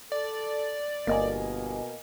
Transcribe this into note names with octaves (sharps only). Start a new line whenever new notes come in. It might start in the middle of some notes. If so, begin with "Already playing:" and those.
A4 D5
G1 B2 A#3 D#5 G#5